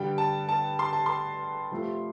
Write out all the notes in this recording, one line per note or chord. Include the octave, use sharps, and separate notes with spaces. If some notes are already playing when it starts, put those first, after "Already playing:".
Already playing: G2 D3 G3 G5
A5
A5
C6
A5
C6
C3 F3 A3